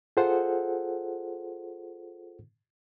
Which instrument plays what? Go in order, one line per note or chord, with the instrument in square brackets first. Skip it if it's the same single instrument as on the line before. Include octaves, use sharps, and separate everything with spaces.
[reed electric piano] F4 G#4 A4 C5 F#5